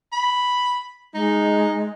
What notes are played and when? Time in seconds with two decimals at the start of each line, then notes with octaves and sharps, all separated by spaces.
0.12 B5
1.14 G#3 D#4